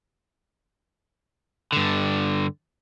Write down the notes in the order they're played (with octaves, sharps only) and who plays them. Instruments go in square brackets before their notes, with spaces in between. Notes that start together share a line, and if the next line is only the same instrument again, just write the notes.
[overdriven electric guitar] G2 D3